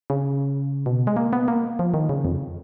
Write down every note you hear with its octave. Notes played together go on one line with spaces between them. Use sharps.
C#3
B2
G#3
A#3
B3
A#3
F3
D#3
C#3
F2